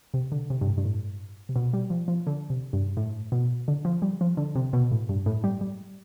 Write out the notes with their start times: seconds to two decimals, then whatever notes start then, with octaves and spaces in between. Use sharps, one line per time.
0.14 C3
0.32 D3
0.50 C3
0.61 G2
0.67 A2
0.78 G2
0.85 A2
1.49 C3
1.56 B2
1.73 G3
1.90 F3
2.08 F3
2.27 D3
2.50 C3
2.73 G2
2.97 A2
3.32 B2
3.68 D3
3.85 F3
4.02 G3
4.21 F3
4.37 D3
4.55 C3
4.73 B2
4.91 A2
5.09 G2
5.26 A2
5.44 G3
5.61 G3